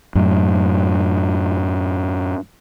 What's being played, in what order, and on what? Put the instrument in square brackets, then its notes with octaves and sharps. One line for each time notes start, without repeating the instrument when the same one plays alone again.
[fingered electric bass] F#2 A2